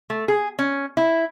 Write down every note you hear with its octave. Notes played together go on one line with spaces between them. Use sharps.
A3
G#4
C#4
E4